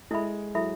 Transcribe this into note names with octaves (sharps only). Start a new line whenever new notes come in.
G#3 E4 A4 E5 B5
F#3 E4 A4 E5 B5